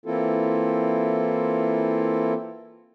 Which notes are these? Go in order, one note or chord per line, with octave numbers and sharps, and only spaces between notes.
E3 A#3 C4 E4 F4 A4